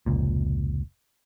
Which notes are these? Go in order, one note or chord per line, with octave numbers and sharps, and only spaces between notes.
F1 C#2 A#2